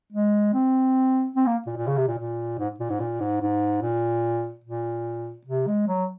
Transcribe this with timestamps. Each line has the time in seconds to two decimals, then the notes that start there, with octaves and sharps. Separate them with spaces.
0.12 G#3
0.54 C4
1.36 C4
1.46 A#3
1.66 A#2
1.77 A#2
1.87 C#3
1.97 C3
2.08 A#2
2.18 A#2
2.59 G#2
2.80 A#2
2.90 G#2
3.00 A#2
3.20 G#2
3.41 G#2
3.82 A#2
4.64 A#2
5.46 C3
5.67 G#3
5.87 F#3